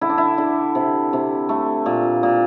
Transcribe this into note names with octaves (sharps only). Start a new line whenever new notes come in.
D3 E4
D4
E4
D3
C3
C3
A3
A#2
A#2